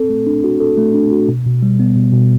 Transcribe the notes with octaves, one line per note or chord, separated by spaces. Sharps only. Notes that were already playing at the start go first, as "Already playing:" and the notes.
Already playing: C4 A4
A3
D4
F#4
A4
A3
D4
F#4
B2
B2
G3
B3
B2
B2